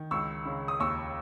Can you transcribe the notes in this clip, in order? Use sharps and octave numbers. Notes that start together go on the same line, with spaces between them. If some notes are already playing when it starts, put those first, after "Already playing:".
Already playing: D#3
C#2 C#6 E6
C#3
D#6
D#2 C#6 E6